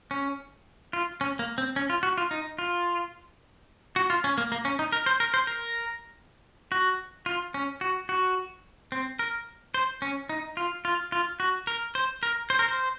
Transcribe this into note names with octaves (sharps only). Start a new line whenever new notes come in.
C#4
F4
C#4
A#3
C4
C#4
F4
F#4
F4
D#4
F4
F#4
F4
C#4
A#3
A#3
C#4
D#4
A#4
C5
A#4
C5
A#4
F#4
F4
C#4
F#4
F#4
C4
A#4
C5
C#4
D#4
F4
F4
F4
F#4
A#4
C5
A#4
C5
A#4
C5